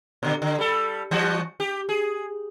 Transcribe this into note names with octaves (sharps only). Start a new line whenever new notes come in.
A#2 D3
D3
G3 A4
E3 G3 F#4
G4
G#4